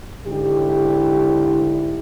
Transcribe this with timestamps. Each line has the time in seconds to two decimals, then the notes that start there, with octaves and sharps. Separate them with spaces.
0.26 G#2 D3 E4 G4